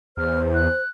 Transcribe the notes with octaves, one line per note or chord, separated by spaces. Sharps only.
E2 C5 F6
F#6